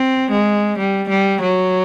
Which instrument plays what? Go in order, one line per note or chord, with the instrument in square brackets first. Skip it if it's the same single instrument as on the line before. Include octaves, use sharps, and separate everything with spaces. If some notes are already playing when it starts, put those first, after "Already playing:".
Already playing: [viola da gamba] C4
G#3
G3
G3
F#3